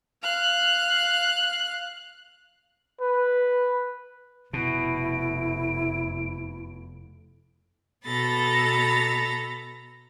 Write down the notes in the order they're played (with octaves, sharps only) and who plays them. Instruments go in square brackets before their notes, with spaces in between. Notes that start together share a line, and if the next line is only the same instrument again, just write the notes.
[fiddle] F5 F#6
[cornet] B4
[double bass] F1 [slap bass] B2 [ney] E4 [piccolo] D7
[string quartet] B2 A4 A#5 B5 A6